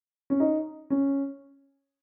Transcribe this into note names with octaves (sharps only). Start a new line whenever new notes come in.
C#4
D#4
C#4